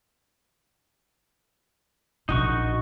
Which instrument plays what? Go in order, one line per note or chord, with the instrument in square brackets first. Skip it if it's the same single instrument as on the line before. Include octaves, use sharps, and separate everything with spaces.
[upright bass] A#1 C#3 [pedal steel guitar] D#4 F#4 C#6